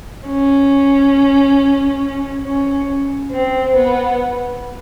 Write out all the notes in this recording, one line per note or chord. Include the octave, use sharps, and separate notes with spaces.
C#4
C#4
C4
B3